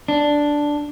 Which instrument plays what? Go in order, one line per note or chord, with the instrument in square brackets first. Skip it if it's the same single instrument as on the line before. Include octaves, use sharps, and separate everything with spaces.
[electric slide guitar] D4